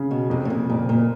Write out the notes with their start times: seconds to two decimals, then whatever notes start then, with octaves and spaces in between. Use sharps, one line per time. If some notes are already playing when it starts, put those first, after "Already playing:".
Already playing: C#3
0.11 B2
0.30 F2 C3
0.45 A2
0.50 A#2
0.69 F#1 A#2
0.89 A#2